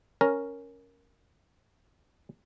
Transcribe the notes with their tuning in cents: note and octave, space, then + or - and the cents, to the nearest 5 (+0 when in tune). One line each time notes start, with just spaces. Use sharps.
C#4 +0 A#4 +0